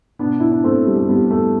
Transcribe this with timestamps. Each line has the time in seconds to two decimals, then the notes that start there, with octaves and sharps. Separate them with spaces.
0.19 B2 B3 D4
0.40 E4
0.52 D4
0.64 A3 C4
0.87 G3
0.98 A3
1.09 G3 B3
1.31 A3